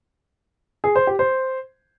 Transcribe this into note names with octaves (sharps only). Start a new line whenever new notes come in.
G#4
C5
G4
C5